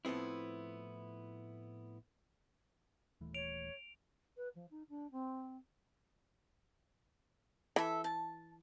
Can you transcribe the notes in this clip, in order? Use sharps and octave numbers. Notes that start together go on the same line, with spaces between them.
A2 F3 B3 C4 E4
D#1 E3 A3
C#5 D7 F7
B4
F3
D#4
D4
C4
E3 A4 E5
A5